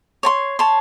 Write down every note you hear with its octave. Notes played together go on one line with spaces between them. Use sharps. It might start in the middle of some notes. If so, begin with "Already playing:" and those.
C#5 A5 C6
C#5 A5 C6